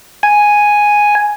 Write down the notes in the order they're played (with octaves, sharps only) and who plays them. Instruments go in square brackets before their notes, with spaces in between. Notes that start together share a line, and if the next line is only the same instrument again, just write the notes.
[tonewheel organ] G#5